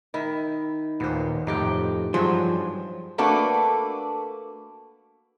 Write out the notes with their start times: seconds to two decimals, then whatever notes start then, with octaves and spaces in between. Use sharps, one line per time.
0.14 D#3 E4
1.00 D#2 A#2 B3 C5
1.47 F2 A2 D#4 G4 G5
2.14 G2 F3 F#3 G#4 C5
3.18 A3 A#3 D4 F#4 A4 B4